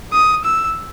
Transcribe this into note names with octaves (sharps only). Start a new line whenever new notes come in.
D#6
E6